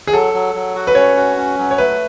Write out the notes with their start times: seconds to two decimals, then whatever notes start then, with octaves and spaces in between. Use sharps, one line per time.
0.07 G#4
0.13 F#3 A4
0.34 F#3
0.55 F#3
0.75 F#4
0.87 B4
0.95 C#4 C#5
1.17 F#4
1.37 C#4
1.58 F#3
1.71 C#5
1.78 A3 B4